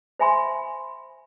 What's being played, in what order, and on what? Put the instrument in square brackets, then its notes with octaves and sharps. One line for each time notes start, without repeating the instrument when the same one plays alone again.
[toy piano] C5 E5 G#5 B5 C6